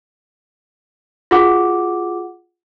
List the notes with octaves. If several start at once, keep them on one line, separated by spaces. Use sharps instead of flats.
F4 F#4 G#4 F#5 D6